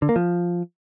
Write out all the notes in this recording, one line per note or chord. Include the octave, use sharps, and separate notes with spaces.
D3
A#3
F3